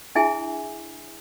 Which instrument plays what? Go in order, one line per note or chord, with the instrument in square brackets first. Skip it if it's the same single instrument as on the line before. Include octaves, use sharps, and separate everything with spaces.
[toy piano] D4 E4 G#4 E5 G#5